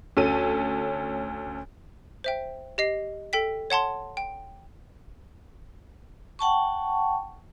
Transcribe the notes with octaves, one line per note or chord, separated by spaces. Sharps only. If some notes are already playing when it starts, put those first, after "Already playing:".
D2 C#4 A4 D#7
C5 E5 G5
G4 D#5 C7
A4 G5 B6
C#5 F#5 A5 C6
G5
F#5 G5 A5 C#6